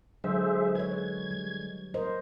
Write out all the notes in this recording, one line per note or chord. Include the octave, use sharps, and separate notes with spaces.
D3 F#3 G#3 G#4 C5 E5
B4 C#5 G#6
G3
A#4 C5 D#5